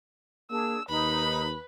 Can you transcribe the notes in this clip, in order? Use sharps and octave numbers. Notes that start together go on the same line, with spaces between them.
A#3 D4 G#4 E6
D#2 D#4 B4 B5